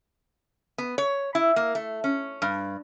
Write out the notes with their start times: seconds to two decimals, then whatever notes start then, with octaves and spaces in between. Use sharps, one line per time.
0.78 B3
0.98 C#5
1.35 E4
1.56 A#3
1.75 A3
2.04 C#4
2.42 G2